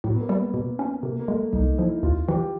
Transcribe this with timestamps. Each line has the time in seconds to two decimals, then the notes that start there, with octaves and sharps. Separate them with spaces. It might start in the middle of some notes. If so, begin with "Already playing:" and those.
0.04 A2 F#3
0.14 B3
0.21 A#3
0.29 G3
0.37 B3
0.54 B2
0.79 C#4
1.03 C3 A#3
1.19 A#3
1.28 G#3 A3
1.53 C2 D#4
1.78 F3 E4
2.03 D#2 F4
2.28 E3 G4